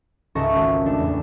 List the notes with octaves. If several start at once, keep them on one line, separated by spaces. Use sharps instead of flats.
C#2 G#2 A4 E5 C#6 A#6
G#1
A3 D4
E2 A2